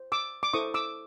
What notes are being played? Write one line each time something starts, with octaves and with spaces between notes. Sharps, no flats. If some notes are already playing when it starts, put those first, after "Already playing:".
Already playing: C5
D6 E6
D6
E4 A4 C5 C#6 D#6
D6 E6